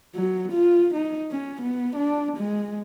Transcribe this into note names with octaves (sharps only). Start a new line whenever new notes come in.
F#3
F4
D#4
C#4
B3
D4
G#3